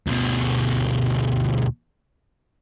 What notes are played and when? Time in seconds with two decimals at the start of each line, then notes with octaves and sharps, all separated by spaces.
0.07 D2 B2